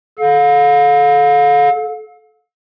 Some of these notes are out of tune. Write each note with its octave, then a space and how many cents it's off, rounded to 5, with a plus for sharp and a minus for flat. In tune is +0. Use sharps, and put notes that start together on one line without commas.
A4 -25 F5 +35